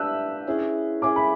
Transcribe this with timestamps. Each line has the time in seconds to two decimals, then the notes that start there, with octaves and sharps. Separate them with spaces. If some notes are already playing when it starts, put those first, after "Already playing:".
Already playing: D4 G4 B4 E5 E6 F#6
0.47 C#4 E4 G#4
1.02 C#4 E4 G#4 D6
1.16 B5